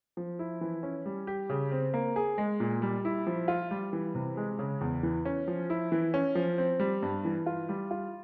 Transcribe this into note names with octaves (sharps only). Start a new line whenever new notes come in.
F3
E4
E3
C#4
G3
G4
C#3
C4
A#3
G#4
G#3
A#2
G3
E4
F3
F4
G3
E3
C3
G#3
C#3
E2
E3
C#4
F3
E4
E3
C#4
F3
C4
G3
G2
E3
F4
G3
F4